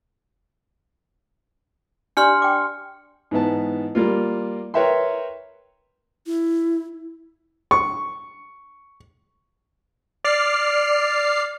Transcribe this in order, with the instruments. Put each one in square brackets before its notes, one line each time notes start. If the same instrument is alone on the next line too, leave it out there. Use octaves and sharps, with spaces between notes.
[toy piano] D4 G4 D5 [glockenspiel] C6 F6 C#7
[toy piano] G5 D6
[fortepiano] G#2 E3 B3 A5
G3 A#3 F4
A#4 B4 C#5 E5 G5 C6
[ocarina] E4
[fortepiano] C#6
[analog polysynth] D5 F6 C7